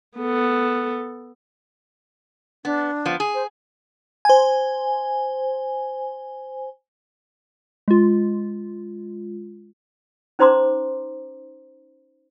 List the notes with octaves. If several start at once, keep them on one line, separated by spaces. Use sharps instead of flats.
B3 A4
B3 D4
F3 B3
G#4
C5
C5 G#5
G#3 F4
C#4 D#4 C5 A#5 C6 D6